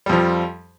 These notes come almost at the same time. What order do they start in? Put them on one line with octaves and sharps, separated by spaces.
G3 F2 F3